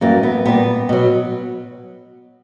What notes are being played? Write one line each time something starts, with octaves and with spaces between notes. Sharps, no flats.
F#2 E3 G3 A#3
B3
A#2 G3 B3
B2 F#3